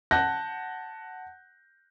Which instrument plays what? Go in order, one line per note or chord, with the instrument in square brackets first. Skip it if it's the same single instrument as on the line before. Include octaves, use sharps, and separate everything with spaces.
[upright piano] F#5 A5 F#6 G6 A#6